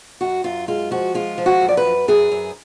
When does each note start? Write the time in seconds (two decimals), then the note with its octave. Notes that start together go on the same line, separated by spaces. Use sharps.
0.21 F#2 F#4
0.44 F#2 F4
0.68 G#3 F4
0.91 F3 F#4
1.14 G#3 F4
1.38 F3
1.46 F#4
1.61 F#2
1.68 D5
1.77 B4
1.85 F#2
2.08 F#2 G#4
2.32 F#2